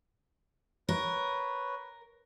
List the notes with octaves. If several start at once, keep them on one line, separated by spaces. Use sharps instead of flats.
A#4 B4 C#5